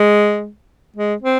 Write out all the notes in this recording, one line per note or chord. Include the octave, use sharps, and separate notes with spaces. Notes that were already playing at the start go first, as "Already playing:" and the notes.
Already playing: G#3
G#3
C4